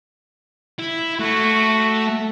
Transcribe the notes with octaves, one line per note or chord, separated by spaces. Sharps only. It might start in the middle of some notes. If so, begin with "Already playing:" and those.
E4
A3 F#4